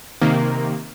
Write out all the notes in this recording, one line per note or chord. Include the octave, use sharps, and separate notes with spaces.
C3 D#3 A#3